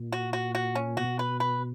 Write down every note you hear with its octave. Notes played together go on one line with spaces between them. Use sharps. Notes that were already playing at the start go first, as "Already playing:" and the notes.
Already playing: A#2
F#4
F#4
F#4
C#4
B2 F#4
B4
B4